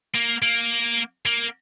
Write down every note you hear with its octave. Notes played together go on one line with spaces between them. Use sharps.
A#3
A#3
A#3